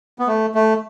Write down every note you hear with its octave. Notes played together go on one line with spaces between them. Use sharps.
B3
A3
A3